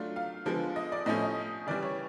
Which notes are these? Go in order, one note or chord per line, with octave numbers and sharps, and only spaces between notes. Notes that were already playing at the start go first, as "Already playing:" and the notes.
Already playing: F#3 A3 D4 F4
F5
D3 F3 G#3 B3
D#5
D5
A2 F3 A3 C#4 D#5
D#5
C#3 E3 G3 D5
C#5